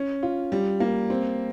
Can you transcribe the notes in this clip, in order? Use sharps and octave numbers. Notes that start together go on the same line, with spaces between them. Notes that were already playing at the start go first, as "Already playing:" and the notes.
Already playing: C#4
F4
G3
A#3
C4